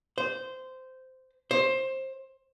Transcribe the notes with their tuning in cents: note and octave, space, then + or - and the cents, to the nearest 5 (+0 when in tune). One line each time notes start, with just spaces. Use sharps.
C5 -15
C5 +20